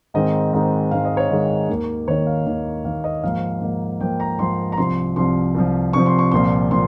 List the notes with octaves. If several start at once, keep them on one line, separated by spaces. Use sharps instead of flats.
G#2 D#3 G#3 C4 D#5
G#2 D#3 G#3 C4
G#2 D#3 G#3 C4 F5
D#5
C#5
G#2 D#3 G#3 C4
D#2 D#3 A#3
D#2 D#3 A#3 C#5
F5
D#2 D#3 A#3
D#2 D#3 A#3 F5
D#5
G#2 F3 A#3 F5
G#2 F3 A#3
G#2 F3 A#3 G5
A#5
G#2 F3 A#3 C6
A#5
C2 C3 F3 C6
C2 C3 F3 C6
C2 C3 F3
C2 C3 F3 C#6
C6
C#6
C2 A#2 F3 C4 C6
A#2 F3 C6